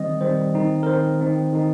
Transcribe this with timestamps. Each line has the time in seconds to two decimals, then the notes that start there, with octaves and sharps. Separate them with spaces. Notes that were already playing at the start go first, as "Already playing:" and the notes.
Already playing: D#3 G3 C4 D#5
0.21 D#3 G3 C4 C5
0.54 D#3 C4 D#4
0.83 A#4
0.86 D#3 C4 D#4 C5
1.19 D#3 C4 D#4
1.52 D#3 C4 D#4